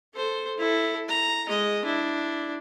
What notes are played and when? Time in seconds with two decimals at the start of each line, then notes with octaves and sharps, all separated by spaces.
0.14 A4 C5
0.58 E4 A4
1.08 A#5
1.48 G#3 D#5
1.85 D4 E4